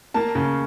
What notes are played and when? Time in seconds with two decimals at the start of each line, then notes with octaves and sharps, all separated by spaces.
0.14 A#3 A5
0.35 C#3